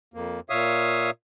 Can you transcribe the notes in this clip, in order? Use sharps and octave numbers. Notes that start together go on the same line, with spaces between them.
F2 A#3
A#2 C#5 E5 F5 D#6